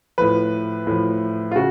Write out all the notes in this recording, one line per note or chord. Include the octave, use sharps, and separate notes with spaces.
A2 F3 B4
A2 F3
F4
C#3 F#4